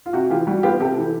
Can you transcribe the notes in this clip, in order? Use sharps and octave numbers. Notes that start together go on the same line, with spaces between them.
F4
C3 F#4
E3 F4 G4
G3 F#4
B3 F4 G4
C3 G4 A4
E3